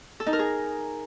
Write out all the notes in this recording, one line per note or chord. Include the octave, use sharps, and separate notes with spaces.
A4
D#4
A#4
G#4